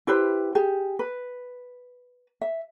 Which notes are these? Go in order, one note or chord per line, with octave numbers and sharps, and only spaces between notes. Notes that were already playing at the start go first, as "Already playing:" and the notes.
E4 G4 B4 C5
G4 G#4
B4
E5